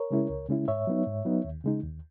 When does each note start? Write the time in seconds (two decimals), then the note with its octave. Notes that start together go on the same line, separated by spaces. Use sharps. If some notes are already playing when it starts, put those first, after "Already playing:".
Already playing: A#4 C#5
0.11 C#3 G#3 C#4 E4
0.30 C#2
0.49 C#3 G#3 C#4 E4
0.68 G#2 C#5 E5
0.87 F#3 B3 D#4
1.06 G#2
1.25 F#3 B3 D#4
1.44 D#2
1.64 C#3 G#3 D#4
1.83 D#2